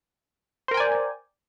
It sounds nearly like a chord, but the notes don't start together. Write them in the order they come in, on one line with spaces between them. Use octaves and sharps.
C5 A#4 G5 G#5 D5